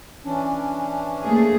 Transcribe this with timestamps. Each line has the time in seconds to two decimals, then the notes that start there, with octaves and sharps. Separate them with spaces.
0.25 E3 C#4 D4
1.25 A3 A#3 G#4